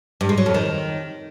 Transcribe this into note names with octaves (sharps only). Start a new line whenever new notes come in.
G2
G#3
F#3
F2
D#3